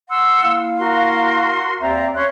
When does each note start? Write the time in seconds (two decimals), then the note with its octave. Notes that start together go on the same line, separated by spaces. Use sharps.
0.10 F#5 C6 E6
0.42 A#3 E4 F5
0.79 F#4 A#4 C6
1.81 D#2 C4 C5 D5 E5 A#5
2.15 C#4 C#5 C6 F#6